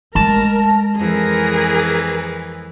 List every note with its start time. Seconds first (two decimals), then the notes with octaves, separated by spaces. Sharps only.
0.15 G#3 A#4 A5
0.97 F2 E3 G#4 A#4